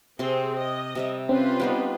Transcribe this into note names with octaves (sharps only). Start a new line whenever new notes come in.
C3 C4 G#4 C6
D#5
C3 G3 E5
C4 C#4 F4 B4 C5
G3 B3 D#4